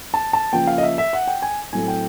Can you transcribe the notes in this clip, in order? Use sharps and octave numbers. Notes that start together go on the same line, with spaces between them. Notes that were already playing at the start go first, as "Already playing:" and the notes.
A5
A5
C#3 F3 A#3 G5
F5
D#5
E5
E5
F#5
G5
G#5
A2 F#3 A3 C4 G#5
G5